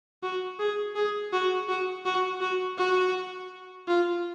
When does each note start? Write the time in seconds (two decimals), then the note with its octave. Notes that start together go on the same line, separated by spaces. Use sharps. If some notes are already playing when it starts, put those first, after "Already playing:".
0.23 F#4
0.59 G#4
0.95 G#4
1.33 F#4
1.69 F#4
2.05 F#4
2.41 F#4
2.78 F#4
3.88 F4